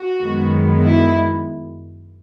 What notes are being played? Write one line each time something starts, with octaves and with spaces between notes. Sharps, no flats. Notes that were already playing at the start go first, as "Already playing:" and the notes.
Already playing: F#4
F#2 D#3 G#3 B3
E4